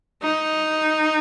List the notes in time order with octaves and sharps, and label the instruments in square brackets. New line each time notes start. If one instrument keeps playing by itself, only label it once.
[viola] D#4